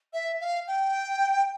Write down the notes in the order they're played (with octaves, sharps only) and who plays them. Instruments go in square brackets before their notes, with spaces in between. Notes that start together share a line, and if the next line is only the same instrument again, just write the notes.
[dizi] E5
F5
G5